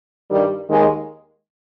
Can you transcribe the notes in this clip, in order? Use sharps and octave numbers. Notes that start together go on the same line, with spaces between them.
G2 D#3 G3
D#2 D#3 G#3